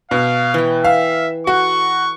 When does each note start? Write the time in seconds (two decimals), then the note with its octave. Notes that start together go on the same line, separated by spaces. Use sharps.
0.11 B2 F5
0.54 E3 G5
0.85 E5 F5
1.47 F#4 A4 C#6